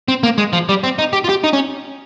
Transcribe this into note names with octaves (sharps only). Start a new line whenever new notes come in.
C4
A#3
G#3
F3
G3
C4
D#4
G4
F4
G4
D#4
C#4